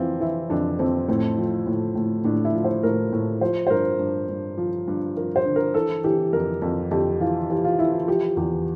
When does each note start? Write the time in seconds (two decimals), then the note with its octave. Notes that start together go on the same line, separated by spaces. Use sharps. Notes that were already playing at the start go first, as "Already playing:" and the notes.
Already playing: F2 E3 C4 E4 F4
0.20 E3 E4
0.50 F2 D4
0.79 F2 C4
1.08 A2 C4
1.38 F3
1.67 A2
1.95 A2
2.24 A2 D4
2.45 E4
2.54 F3
2.64 C5
2.83 A2 A#4
3.13 A2
3.41 F3 C5
3.67 C5
3.70 G2 A#4
3.99 G2
4.29 G2
4.58 F3
4.88 G2
5.17 F3 A#4
5.36 C5
5.45 D3
5.56 A#4
5.74 E3 A4
6.04 E3 G4
6.33 F2 A#4
6.62 F2
6.91 F2 G4
7.20 E3 F4
7.49 E3 G4
7.64 F4
7.79 E3 E4
7.93 F4
8.08 F3 G4
8.37 E2 G4